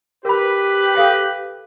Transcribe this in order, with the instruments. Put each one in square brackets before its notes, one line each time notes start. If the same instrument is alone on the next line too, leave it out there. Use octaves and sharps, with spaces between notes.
[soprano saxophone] G4 [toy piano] A#4 B5 [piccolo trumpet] B4
[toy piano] A4 F5 G5